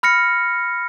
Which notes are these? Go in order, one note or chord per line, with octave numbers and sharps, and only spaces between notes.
B5 F6 A#6 C#7